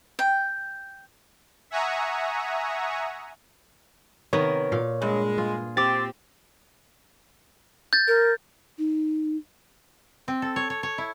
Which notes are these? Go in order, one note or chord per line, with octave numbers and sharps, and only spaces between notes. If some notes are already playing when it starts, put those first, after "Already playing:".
G5
E5 F#5 G#5 A#5 C#6 D#6
C3 D#3 B3 A#4 B4 C#5
A#2 F5
G2 G#3
F4 G#4
C4 G4 D6 A6
G6 A6
A#4
D#4
C4
A4
C#5
C#5
C#5
E4